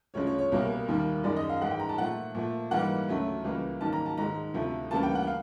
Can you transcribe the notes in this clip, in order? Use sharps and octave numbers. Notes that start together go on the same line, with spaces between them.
D2 C#3 F3 G#3 C#5
C#5
C#5
C2 B2 G3 A#3
D#2 D#3 G3 A#3
F#2 D#3 G#3 D5
D#5
F5
G#2 E3 G#3 F#5
G5
A#5
A5
A#2 F3 A3 F#5
A#2 F3 A3
G#2 E3 G3 A#3 F#5
D2 C#3 F#3 A3
C#2 C#3 E3 G3 A#3
G#2 D#3 F#3 A#3 A5
A#5
A5
G#2 D#3 G#3 A#5
D2 C3 F3 A3
D2 C#3 E3 G3 A#3 A5
G5
F#5
F5